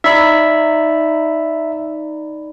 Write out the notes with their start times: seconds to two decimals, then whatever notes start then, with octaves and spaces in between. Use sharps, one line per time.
0.04 D#4 D5 E5 B5